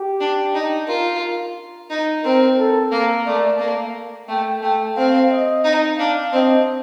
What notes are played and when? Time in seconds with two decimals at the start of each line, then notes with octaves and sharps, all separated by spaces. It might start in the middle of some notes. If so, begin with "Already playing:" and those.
Already playing: G4
0.21 D4
0.55 D#4
0.88 F4 A#4
1.90 D#4
2.24 C4 A#4
2.58 A4
2.92 A#3 A#4
3.26 A3 D5
3.60 A#3
4.28 A3 G5
4.62 A3 G5
4.96 C4 F5
5.30 D#5
5.64 D#4
5.98 D4 F5
6.32 C4 D#5